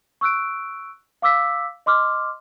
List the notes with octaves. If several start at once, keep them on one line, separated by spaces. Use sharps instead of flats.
C#6 E6 F#6 D7
F5 D6 E6 B6
D#5 C6 D6 F6